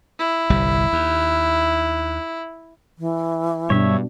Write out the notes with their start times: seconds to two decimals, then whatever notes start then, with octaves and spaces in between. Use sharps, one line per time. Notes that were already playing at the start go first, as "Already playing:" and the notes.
0.19 E4
0.50 G1 C2 G3
0.93 D#2
2.98 E3
3.70 G2 B2 D4 C#5 E5